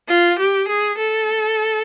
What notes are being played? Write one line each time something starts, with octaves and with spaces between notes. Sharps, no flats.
F4
G4
G#4
A4